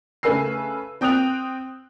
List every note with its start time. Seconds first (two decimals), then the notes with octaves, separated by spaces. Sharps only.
0.23 C#3 A3 B4 G#5 E6 C7
1.01 C4 G5 D#6 F#6 F7